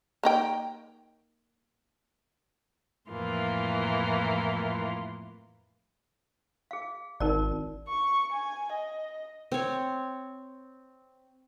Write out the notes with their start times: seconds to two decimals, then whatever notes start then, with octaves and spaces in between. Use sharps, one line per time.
0.23 A#3 D#4 G5
3.10 F2 A2 E3 A#3 F4
6.71 G#4 F5
7.20 G#1 D#4 A#4 D5
7.88 C#6
8.33 G#5
8.73 D#5
9.52 C4 C#5